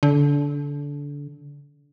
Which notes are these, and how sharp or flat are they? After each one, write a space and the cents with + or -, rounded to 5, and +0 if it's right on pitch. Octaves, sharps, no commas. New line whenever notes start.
D3 -25